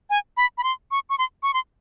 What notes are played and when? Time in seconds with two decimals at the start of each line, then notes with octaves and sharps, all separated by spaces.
0.10 G#5
0.37 B5
0.58 B5
0.64 C6
0.91 C#6
1.10 C#6
1.18 C6
1.43 C#6
1.54 C6